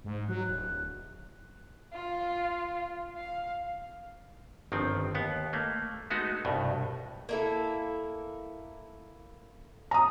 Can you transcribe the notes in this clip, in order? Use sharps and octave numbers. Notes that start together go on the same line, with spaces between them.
G#2
F#3 F#6
D1
F4
F5
G1 D#3 F3 C4
D#2 B3
A3 A#3
G#3 A3 B3 D#4 F#4
C2 G2 B2
A#3 E4 A4
A#5 D#6